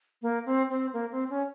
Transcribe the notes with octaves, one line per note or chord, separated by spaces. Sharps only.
A#3
C4
C4
A#3
C4
C#4